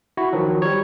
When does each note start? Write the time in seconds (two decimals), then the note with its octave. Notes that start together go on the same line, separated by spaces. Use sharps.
0.17 E4 F#4
0.33 D#3 F3 F#3
0.62 G3 C#5